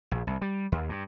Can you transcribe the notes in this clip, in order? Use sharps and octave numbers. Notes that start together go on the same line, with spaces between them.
A#1
C2
G3
D#2
G2